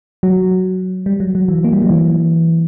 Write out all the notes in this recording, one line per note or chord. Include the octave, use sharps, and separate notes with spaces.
F#3
G3
F#3
F#3
E3
A#3
G3
F#3
E3